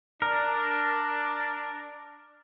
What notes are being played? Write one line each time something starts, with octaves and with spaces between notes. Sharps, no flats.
D4 A#4